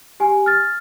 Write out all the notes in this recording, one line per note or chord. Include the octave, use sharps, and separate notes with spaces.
G4 G#5
F6 A6